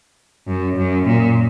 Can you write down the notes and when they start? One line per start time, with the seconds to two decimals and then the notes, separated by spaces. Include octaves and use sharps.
0.47 F#2
0.77 F#2
1.06 A#2